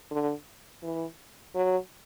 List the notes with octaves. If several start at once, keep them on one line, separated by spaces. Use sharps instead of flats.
D3
E3
F#3